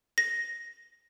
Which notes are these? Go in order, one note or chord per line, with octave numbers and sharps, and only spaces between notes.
A#6